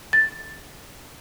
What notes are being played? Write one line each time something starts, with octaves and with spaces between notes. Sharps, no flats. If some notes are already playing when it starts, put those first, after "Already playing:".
A6